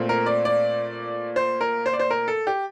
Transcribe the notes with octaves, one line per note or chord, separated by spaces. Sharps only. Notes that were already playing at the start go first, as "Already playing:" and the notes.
Already playing: A#2 A3 C4
A#4
D5
D5
C5
A#4
C5
D5
C5
A#4
A4
G4